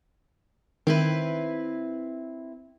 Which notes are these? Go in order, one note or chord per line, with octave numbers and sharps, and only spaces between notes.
D#3 C4 E4 B4